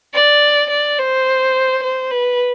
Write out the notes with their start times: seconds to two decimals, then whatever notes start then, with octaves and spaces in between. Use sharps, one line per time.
0.14 D5
0.70 D5
0.99 C5
1.83 C5
2.11 B4